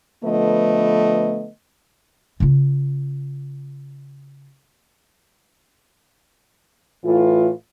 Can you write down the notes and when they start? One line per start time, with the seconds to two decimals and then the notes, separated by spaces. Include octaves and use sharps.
0.24 D3 F3 A3 B3 B4 D#5
2.40 C#3 F4
7.04 A2 E3 F4